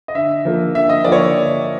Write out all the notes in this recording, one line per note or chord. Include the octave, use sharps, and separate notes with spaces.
D#5
D3 E5
F3 A#3
D3 E5
D#5
F3 A#3 D5
C#5